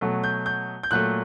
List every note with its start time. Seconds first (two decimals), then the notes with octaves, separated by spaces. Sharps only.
0.01 B2 F#3 A3
0.24 G6
0.46 G6
0.83 G6
0.91 A#2 F#3 A3 F#6